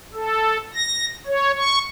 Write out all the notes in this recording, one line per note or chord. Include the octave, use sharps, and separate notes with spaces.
A4
A#6
C#5
C#6